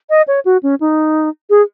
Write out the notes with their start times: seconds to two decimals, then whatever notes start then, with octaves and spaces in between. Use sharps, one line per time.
0.10 D#5
0.28 C#5
0.45 F#4
0.63 C#4
0.80 D#4
1.50 G#4